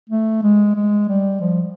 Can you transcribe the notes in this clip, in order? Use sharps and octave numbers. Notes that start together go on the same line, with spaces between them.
A3
G#3
G#3
G3
F3